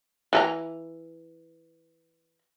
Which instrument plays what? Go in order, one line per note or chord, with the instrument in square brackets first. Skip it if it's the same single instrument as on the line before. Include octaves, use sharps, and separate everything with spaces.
[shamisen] E3 A4 A#5